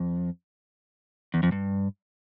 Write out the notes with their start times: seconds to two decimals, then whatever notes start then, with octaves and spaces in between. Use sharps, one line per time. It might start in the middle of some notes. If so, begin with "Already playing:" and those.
Already playing: F2
1.34 E2
1.43 F2
1.52 G2